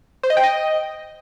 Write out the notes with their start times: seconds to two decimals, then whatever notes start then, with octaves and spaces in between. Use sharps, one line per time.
0.23 C5
0.30 D#5
0.37 G5
0.43 D#5